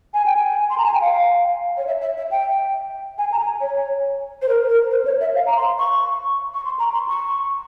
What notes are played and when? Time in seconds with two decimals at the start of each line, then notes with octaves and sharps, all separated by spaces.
0.14 G#5
0.26 G5
0.36 G#5
0.70 C6
0.78 A#5
0.85 G#5
0.93 G5
1.01 F5
1.77 C#5
1.87 E5
2.01 E5
2.17 E5
2.31 G5
3.18 G#5
3.32 A#5
3.39 G#5
3.61 C#5
4.42 C5
4.48 A#4
4.69 A#4
4.91 C5
5.05 C#5
5.21 E5
5.35 F5
5.46 A#5
5.56 C6
5.79 C#6
6.54 C#6
6.65 C6
6.79 A#5
6.94 C6
7.08 C#6